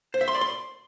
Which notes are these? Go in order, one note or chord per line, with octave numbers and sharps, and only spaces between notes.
C5
E5
C6
D5
C6